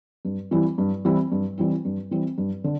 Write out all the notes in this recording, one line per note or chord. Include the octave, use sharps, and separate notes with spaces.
G2
E3 G3 C4 E4
G2
E3 G3 C4 E4
G2
E3 G3 C4 E4
G2
E3 G3 C4 E4
G2
D3